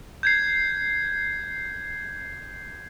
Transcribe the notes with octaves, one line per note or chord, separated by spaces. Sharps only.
G6 G#6 C7